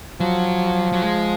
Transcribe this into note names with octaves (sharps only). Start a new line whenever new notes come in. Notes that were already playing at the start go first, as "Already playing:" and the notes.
F3 F#3
F#3
G#3